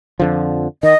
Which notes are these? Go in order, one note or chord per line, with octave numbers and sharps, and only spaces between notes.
F2 D3 F3
D#3 D#5